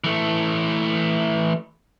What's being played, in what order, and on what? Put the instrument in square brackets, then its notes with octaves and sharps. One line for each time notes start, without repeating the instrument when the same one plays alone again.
[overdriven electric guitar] E3 A3